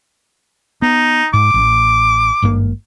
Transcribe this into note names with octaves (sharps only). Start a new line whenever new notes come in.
B3 D#4
G#2 D6
A1
G#1 G2 A#3